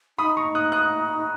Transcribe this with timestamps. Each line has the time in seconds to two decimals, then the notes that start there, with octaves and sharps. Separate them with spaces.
0.18 D#4 B5 D#6
0.37 A#5 C#6
0.55 D#6 F#6
0.72 D#6 F#6